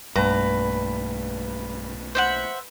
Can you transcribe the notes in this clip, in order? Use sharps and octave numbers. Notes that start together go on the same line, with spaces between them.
B1 G2 A3 A#3 B4 A#5
C5 E5 F#5